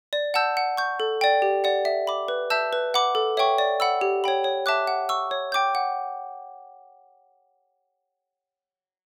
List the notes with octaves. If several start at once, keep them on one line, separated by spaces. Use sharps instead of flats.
D5
F#5 A5 E6 G6
F#5
C#6 G6
A4
D5 G5
G4
D5 F#5
E5
B5 D6
B4
E5 A5 E6 G6
B4
F#5 B5 D6
A4
C#5 E5 G5 C#6
D5
F#5 B5 E6
G4
C#5 G5 B5
C#5
E5 A5 D6 F#6
F#5
C#6 E6
C#5
G5 D6 G6
F#5